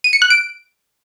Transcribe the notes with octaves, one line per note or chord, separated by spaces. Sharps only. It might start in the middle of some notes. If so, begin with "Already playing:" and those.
D#7
C#7
F#6
D7